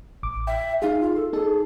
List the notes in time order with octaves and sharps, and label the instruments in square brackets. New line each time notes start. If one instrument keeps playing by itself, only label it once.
[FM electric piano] A1 D6
[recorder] E5 [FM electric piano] G5
[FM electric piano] D#4 G#4 [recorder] F5
[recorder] F4
A4
[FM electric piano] D#4 A4 [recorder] G#4